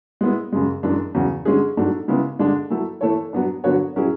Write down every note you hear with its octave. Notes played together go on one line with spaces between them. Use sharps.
G#3 B3 E4
F#2 C#3 G#3
F#2 E3 G#3 D4
E2 C#3 F#3
D3 G#3 C#4 G#4
G#2 F#3 A3 D4
C#3 G#3 B3 E4
D3 G#3 D4
F#3 A3 E4 A4
E3 A3 E4 A4 C#5
F#3 B3 D4
D3 F#3 B3 F#4 C#5
F#3 C#4 E4 G#4